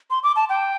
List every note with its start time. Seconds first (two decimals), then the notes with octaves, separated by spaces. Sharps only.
0.10 C6
0.23 D6
0.36 A5
0.49 G5